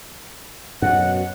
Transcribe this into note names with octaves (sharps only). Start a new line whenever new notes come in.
F#2 B2 F#5